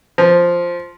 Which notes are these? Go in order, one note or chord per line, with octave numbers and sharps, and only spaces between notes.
F3